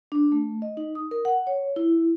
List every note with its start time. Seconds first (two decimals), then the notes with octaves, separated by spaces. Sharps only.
0.12 D4
0.32 A3
0.62 D#5
0.77 D#4
0.95 D#6
1.11 A#4
1.25 F#5
1.47 C#5
1.76 E4